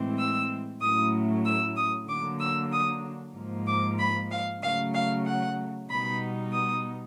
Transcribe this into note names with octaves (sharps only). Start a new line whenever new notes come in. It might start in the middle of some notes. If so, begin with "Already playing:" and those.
Already playing: A2 E3 G#3 C4
E6
A2 F#3 A3 C#4 E4 D#6
E6
D#6
D3 F#3 A#3 D4 D6
E6
D#6
G#2 F3 A#3
D6
B5
F5
C#3 F#3 A3 F5
F5
F#5
B2 G3 B3 D#4 B5
D#6